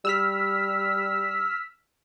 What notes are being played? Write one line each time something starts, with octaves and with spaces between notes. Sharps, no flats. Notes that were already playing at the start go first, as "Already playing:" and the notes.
G3 E6 F6 B6